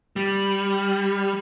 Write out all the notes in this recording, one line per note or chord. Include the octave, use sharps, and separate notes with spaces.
G3